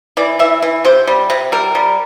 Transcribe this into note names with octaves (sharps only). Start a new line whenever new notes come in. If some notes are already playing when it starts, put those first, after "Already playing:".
E3 D5
E3 E5
E3
C3 C5
G3
C3
G3 A#4
G3